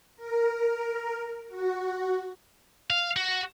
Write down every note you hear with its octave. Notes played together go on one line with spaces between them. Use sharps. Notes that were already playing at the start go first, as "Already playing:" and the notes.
A#4
F#4
F5
F#4